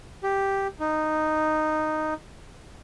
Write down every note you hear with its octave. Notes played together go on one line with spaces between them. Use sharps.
G4
D#4